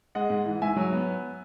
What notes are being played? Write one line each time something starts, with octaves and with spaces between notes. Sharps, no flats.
G#3 D#5 F#5
G#2
E3
G#2 E5 G#5
F#3
B3